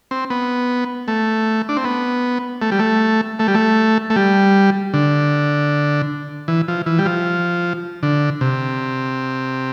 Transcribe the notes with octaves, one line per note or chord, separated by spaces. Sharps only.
C4
B3
A3
D4
C4
B3
A3
G3
A3
A3
G3
A3
A3
G3
D3
E3
F3
E3
G3
F3
D3
C3